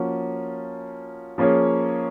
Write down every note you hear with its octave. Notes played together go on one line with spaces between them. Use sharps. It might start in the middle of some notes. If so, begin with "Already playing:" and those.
Already playing: F3 A#3 C#4 F#4
F3 A#3 C#4 G#4 C#5